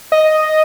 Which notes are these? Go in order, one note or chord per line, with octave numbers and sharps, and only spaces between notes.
D#5